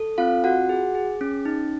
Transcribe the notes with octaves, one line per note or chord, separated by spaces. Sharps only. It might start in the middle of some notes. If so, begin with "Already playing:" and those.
Already playing: A4
C4 F4 F5
F4 F#4 F#5
G#4
G#4
C#4
D#4